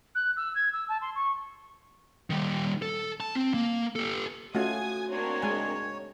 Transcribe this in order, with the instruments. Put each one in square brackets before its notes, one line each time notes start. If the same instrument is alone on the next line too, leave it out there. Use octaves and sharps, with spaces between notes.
[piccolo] F#6
E6
G#6
E6
A5
C6
C#6
[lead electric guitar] D#3 G3
A4
A5
C4
A#3
G4 A4
[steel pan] A3 C#4 F4 [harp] F#4 [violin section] G#5 D#6 G#6
[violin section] A#3 C4 D4 [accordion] C#5
[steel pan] G#3 G#5